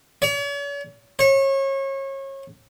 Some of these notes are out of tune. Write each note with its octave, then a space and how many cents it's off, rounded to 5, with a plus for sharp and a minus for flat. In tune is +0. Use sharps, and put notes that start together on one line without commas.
C#5 +45
C#5 -30